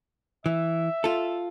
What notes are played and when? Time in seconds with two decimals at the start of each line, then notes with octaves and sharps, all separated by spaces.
0.46 E3 E5
1.04 F4 A4